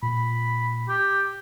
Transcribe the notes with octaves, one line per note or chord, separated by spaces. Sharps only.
A#2 B5
G4